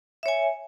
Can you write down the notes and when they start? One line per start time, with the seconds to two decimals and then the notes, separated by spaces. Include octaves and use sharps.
0.23 E5
0.26 C#5
0.28 G#5